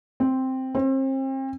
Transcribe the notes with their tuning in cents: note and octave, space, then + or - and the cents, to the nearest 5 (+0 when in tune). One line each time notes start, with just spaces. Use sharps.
C4 +0
C4 +35